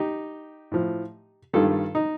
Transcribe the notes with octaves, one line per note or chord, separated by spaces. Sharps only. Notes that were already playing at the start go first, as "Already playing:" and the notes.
Already playing: D#4 G4
A2 F3
G2 D#3 G3 F4 A4
D#4